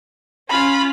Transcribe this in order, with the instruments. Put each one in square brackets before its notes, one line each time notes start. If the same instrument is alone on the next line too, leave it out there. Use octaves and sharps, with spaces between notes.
[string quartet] C#4 F4 [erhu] B5